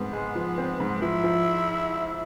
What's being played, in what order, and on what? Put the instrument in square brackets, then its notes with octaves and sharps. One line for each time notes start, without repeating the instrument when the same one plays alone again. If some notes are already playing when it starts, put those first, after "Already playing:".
Already playing: [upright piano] G#2 C4 [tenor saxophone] B3
[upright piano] G#3
F3
C4
G#2
[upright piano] F3 [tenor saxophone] E4
[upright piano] F3